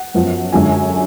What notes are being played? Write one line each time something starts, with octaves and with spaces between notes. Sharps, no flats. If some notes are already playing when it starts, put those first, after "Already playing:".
Already playing: F#5
F#2 F3 B3 F4
F#2 D3 G#3 D4 F4 G#5